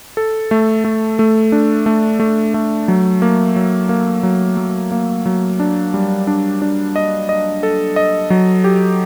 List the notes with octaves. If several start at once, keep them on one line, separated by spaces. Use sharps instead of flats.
A4
A3
A3
A3
D4
A3
A3
A3
F#3
A#3
F#3
A#3
F#3
F#3
A#3
F#3
D4
G3
D4
D4
D#5
D#5
A4
D#5
F#3
G4